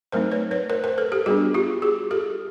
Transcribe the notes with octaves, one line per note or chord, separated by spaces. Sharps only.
F#3 A3 C4 D#4 A#4 C5
B4 C#5
B4 C#5
A#4 C5
A#4 C5
A4 B4
G4 A4
G3 B3 D4 F#4 G#4
F4 G4
F#4 G#4
G4 A4